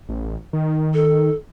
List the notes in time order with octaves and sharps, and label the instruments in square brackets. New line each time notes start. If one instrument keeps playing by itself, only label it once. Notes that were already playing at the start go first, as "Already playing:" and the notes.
[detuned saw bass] A1
D#3
[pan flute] A4